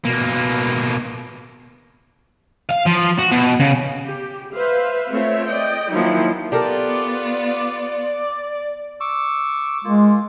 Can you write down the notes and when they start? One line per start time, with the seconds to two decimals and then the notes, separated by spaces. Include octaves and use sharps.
0.05 B2 A#3
2.71 F5
2.87 F3
3.19 F#4
3.32 B2
3.60 C#3
4.05 G4
4.54 B4 C5 E5 F5
5.10 A3 C4 F4 C#5 E5
5.48 D5 D#5 G5
5.91 D#3 F3 F#3 A#3 D#4 E4
6.52 B3 F4 G4 A4 A#4 D5
9.00 C#6 D6 E6
9.85 G#3 A#3 F4